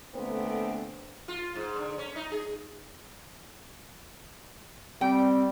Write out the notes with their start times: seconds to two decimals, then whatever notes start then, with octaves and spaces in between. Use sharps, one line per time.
0.14 A#2 D3 A3 B3 C4
1.28 F4
1.55 G#2
1.76 D3
1.98 C#4
2.16 D#4
2.32 G#4
5.01 G3 C4 G5